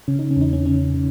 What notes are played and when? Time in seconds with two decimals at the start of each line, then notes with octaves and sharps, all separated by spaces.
0.08 C#3 C#4
0.19 D#4
0.31 C#4
0.36 E2 D#4
0.53 C#4
0.65 C#3 C#4
0.94 C#3